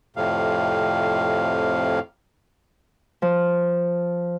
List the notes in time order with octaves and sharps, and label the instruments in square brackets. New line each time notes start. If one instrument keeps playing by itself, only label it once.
[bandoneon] F2 A2 C3 F5
[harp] F3